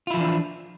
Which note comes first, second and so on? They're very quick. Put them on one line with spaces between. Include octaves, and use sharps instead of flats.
F4 E4 F3 E3 D4